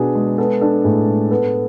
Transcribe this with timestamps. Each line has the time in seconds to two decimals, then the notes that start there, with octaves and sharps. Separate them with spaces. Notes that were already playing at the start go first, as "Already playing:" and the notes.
Already playing: B2 B3 D4 G#4
0.15 G#3
0.38 B3 A4
0.61 D4 A4
0.84 A2 G#4
1.08 G#3
1.31 B3 A4